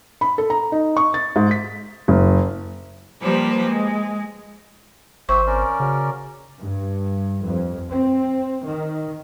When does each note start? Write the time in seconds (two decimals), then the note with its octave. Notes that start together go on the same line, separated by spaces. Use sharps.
0.21 B5
0.38 A4
0.50 A#5
0.72 D#4
0.97 C#6
1.14 A6
1.36 G#2
1.51 B6
2.08 F#1
3.21 F3 G3 A#3 G4 B4 C5
3.66 G#3
5.29 G#1 C4 G4 C5 E5 C#6
5.47 C#4 A#4 D5
5.80 C#3 F#3
6.59 G2
7.43 F2
7.90 C4
8.66 D#3